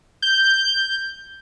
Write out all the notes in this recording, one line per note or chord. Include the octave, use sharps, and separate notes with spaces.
G6